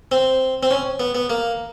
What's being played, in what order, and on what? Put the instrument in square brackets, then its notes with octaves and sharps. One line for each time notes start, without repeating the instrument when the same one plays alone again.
[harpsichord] C4
C4
C#4
B3
B3
A#3